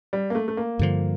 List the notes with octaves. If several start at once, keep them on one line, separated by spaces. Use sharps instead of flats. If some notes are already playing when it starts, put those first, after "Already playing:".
G3
A#3
A3
A3
A#3
G2 D3 F3